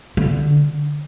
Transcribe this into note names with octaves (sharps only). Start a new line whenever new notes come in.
D3